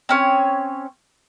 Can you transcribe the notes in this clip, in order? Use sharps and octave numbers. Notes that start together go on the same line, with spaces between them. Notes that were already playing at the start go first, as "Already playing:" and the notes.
C4 C#4 C#5